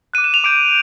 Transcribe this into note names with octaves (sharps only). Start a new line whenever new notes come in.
D6 F#6 D#7
E7
F7
D6 G6 D7